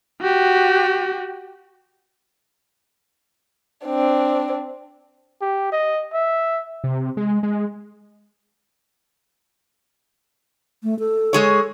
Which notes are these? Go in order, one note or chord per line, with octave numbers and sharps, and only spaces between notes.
F#4 G4
C4 D4
G4
D#5
E5
C3
G#3
G#3
A3
A4
G#3 G#4 C#5